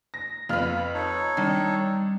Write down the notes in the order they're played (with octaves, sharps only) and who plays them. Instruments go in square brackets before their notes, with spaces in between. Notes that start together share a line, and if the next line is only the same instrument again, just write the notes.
[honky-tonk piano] A#6
[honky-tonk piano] F2 F6 [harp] B3 G#4 [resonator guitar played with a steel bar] F4 B4
[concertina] D#4 A4 C#5 [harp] A5 A#5
[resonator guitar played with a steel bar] D#3 [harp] G3 C4 [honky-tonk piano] D4